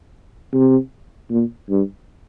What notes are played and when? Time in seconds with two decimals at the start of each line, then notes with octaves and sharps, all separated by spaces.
0.53 C3
1.30 A#2
1.70 G2